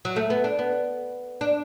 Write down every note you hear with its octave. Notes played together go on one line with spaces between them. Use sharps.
F#3
A3
B3
D4
B3
D4